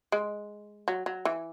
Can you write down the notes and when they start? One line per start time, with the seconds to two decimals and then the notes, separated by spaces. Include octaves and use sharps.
0.12 G#3
0.88 F#3
1.06 F#3
1.25 E3